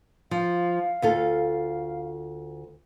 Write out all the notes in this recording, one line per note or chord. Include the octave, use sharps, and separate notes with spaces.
F3 F5
D2 F4 A4